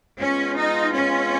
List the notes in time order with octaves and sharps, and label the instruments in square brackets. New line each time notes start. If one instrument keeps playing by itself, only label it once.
[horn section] G#3 B3 F4 [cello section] C#4
[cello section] D#4
C#4